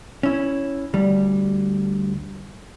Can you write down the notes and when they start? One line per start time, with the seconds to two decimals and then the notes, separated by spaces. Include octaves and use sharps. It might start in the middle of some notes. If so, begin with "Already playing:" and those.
0.23 C#4 E4
0.94 D2 G3